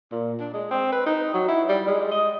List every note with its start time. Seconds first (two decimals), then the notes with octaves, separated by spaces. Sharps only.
0.12 A#2
0.40 D4
0.54 G#3
0.71 C4
0.92 B4
1.06 D#4
1.34 F#3
1.48 E4
1.69 G3
1.87 G#3
2.11 D#5